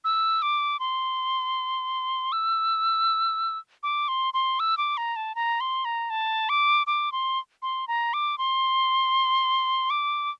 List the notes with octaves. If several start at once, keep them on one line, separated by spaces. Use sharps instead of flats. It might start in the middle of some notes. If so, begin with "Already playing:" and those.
E6
D6
C6
E6
D6
C6
C6
E6
D6
A#5
A5
A#5
C6
A#5
A5
D6
D6
C6
C6
A#5
D6
C6
D6